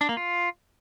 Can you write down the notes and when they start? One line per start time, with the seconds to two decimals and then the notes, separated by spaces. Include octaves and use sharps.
0.01 D4
0.09 A#3
0.17 F4